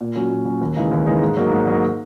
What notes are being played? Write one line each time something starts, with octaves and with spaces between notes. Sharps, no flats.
A#2
F#3 C#4 F#4
A#2
F#3 C#4 F#4
D#2
C#3 E3 G#3 D#4
D#2
C#3 E3 G#3 D#4
G#2
F#3 A#3 D#4
G#2
F#3 A#3 D#4